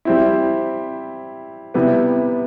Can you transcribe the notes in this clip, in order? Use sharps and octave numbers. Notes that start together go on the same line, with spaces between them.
G3 C4 E4
C3 G3 B3 E4